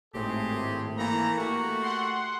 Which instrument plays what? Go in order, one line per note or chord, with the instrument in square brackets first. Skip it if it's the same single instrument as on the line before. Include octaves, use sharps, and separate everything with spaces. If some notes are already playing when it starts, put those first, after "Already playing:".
[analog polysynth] G#1 A2 [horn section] C4 G4 G#4
[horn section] E3 A3 A#5 [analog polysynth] A#3
[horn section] A3 F#4 G4
[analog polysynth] F#5 C6